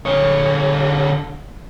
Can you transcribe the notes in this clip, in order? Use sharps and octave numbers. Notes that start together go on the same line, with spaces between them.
D3 C#5